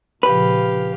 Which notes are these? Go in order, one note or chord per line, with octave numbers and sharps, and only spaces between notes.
A#2 C#3 F3 G4 B4 F5